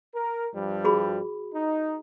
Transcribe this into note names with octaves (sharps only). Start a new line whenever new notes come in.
A#4
G2 F3 G3
F#4 G#4 B5
D#4